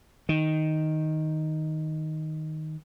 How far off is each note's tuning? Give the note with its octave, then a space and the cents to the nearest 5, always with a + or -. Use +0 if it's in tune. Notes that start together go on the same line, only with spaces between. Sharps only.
D#3 +5